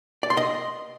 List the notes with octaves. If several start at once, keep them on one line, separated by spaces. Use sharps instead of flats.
D5
C6
D#5